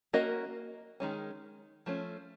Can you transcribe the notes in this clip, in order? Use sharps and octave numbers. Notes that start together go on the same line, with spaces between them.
A#3 C#4 F#4 A#4 D#5
D#3 G#3 C#4
F3 A3 C#4